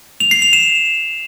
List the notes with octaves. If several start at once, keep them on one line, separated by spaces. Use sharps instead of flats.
F7
C7
F7
E7